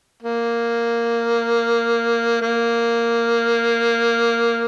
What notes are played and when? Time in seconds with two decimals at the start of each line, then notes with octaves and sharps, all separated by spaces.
0.22 A#3
2.41 A#3